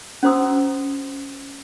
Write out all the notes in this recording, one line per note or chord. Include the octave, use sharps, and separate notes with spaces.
C#4 F#4 C5 A#5 D#6 E6